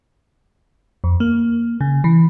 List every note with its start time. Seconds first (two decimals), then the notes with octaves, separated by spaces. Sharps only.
1.04 F2
1.20 A#3
1.81 C#3
2.04 E3